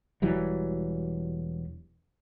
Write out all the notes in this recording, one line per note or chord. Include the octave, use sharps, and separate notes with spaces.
E1 E3 F#3 G3